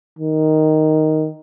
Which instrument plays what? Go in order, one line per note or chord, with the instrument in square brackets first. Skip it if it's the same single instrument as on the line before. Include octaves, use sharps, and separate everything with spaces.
[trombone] D#3